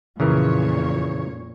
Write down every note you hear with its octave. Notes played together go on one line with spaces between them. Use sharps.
F2 A#2 C#3 E3 A#4 C#5